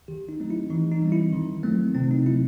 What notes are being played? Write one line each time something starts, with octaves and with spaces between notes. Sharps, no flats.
D#3 G4
D#4
F#3 A3 C4 D#4
E4
E3 D#4
D#4
G3 C4
E4
D#3
F#3 A3 C4
C3 C4
D#4
F#3 A3 E4